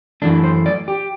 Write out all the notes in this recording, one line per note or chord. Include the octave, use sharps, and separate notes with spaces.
F#2 E3 A3 D4
C5
D5
G4